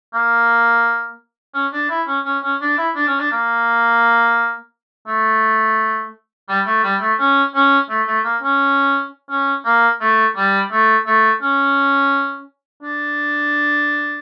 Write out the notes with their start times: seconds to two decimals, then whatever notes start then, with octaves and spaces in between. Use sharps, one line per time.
0.14 A#3
1.54 C#4
1.73 D4
1.89 E4
2.07 C#4
2.26 C#4
2.43 C#4
2.61 D4
2.78 E4
2.96 D4
3.07 C#4
3.19 D4
3.31 A#3
5.07 A3
6.49 G3
6.66 A3
6.83 G3
7.01 A3
7.19 C#4
7.54 C#4
7.89 A3
8.07 A3
8.24 A#3
8.42 C#4
9.30 C#4
9.65 A#3
10.01 A3
10.36 G3
10.71 A3
11.07 A3
11.42 C#4
12.83 D4